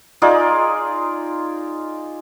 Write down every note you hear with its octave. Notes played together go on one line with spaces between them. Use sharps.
D#4 F4 G#4 D5